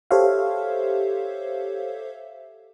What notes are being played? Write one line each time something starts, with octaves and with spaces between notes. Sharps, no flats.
G4 A4 C5 C#5 E5 F5